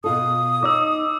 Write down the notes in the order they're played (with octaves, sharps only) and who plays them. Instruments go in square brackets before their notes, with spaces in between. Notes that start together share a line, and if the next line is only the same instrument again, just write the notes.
[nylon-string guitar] B2 F4 A4 [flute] D#6
[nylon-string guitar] D#4 C#5 D#5 [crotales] D6 E6